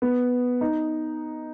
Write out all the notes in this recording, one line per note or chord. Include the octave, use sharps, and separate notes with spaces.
B3
D#4